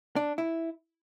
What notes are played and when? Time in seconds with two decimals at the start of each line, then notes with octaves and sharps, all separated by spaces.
0.16 D4
0.38 E4